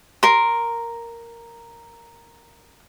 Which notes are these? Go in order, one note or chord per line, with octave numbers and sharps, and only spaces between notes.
A#4 C6